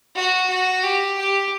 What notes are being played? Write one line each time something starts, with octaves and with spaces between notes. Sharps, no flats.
F#4
F#4
G4
G4